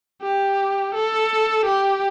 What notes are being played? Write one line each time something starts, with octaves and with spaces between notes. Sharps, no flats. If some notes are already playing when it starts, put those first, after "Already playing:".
G4
A4
G4